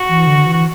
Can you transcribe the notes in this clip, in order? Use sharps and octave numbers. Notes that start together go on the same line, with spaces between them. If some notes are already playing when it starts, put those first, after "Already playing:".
Already playing: F#4
E3
D3
E3
F#4